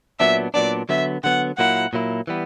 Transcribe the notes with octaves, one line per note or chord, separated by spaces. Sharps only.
A#2 F#3 B3 D4 E5
A#2 F#3 B3 D4 D5
D3 F#3 B3 E5
D3 F#3 B3 F#5
A#2 F#3 A#3 E4 F#5
A#2 F#3 A#3 E4
E3 G3 B3